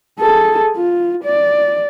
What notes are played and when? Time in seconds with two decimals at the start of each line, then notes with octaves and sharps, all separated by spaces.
0.19 G#4 A4
0.76 F4
1.24 D5